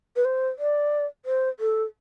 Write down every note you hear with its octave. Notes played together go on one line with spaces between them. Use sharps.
B4
C5
D5
C5
A4